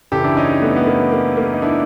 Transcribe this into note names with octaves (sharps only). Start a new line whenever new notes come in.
F#2 C#3 E3 G4 A4
D4 E4
C#4 D#4
A3 B3
B3
A#3
A#3
A#3
D#4
D4 E4